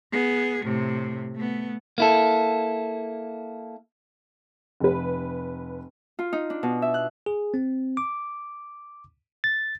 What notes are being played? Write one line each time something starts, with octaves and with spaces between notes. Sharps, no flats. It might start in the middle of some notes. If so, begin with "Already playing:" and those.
B3 G#4
A2 C3
A3 B3
A#3 E4 A4
F1 B4
F4
D#4
D4
B2
E5
F#6
G#4
C4
D6
A6